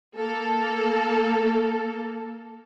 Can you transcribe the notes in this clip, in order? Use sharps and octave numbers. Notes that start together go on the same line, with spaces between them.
A#3 A4